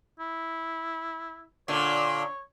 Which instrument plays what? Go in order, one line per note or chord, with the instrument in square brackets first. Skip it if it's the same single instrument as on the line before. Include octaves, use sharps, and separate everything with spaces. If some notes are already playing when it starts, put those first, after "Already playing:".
[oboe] E4
[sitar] A#2 D3 [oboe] C#5